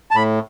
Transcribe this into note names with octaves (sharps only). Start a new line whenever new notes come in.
A5
A2 B5